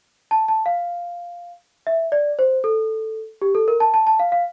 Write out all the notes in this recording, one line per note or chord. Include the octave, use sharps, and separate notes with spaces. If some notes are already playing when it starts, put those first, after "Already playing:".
A5
A5
F5
E5
D5
C5
A4
G4
A4
A#4
A5
A5
A5
F5
F5